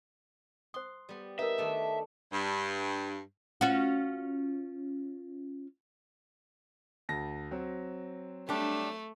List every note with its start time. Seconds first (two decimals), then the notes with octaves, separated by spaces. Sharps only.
0.74 C5 C6 D#6
1.09 G3 B3
1.39 D#4 A#4 B4 E5
1.58 D#3 A3 D4
2.33 G2
3.61 C#4 F4 F#4
7.09 D2 A5 A#6
7.51 F#3 C4
8.49 G3 A3 D4